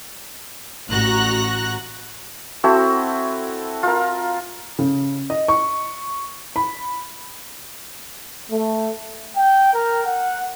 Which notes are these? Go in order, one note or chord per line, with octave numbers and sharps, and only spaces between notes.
A1 F#4 A#5 F#6 A#6
C4 E4 F#4 A4
F4 A#4
C#3
D#5
C#6
B5
A3
G5
A#4
F#5